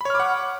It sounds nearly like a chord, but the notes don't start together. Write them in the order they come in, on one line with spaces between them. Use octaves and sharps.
B5 C#5 F6 D6 F#5